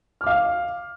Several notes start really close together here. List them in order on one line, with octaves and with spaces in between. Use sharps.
F6 D6 F5